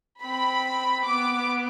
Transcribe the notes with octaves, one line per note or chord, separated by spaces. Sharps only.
C4 B5
B3 D6